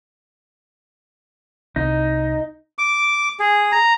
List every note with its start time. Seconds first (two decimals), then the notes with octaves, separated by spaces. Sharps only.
1.76 C2 D#4
2.78 D6
3.40 G#4
3.72 A#5